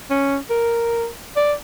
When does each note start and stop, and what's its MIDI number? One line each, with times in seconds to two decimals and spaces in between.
0.10 0.38 61
0.50 1.08 70
1.36 1.54 74